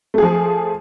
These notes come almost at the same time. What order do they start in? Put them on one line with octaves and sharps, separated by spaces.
A3 G#4 F3